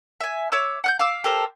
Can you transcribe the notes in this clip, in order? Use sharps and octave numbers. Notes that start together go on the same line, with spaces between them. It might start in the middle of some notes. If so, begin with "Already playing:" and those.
E5 G#5
C#5 E5 D6 E6
F#5 F#6 G6
F5 D6 E6
G4 A4 A#4 C5